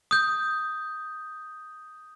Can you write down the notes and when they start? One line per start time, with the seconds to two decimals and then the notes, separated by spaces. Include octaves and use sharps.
0.11 D#6 G6